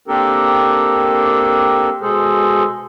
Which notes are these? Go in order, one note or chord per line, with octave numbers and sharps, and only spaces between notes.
A#3 C4 D4 G4 A4 A#4
B2 G#3 G#4 A4 C5